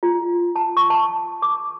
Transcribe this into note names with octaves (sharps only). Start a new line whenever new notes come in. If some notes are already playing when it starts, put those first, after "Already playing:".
F4
A5
C#6
A5
D6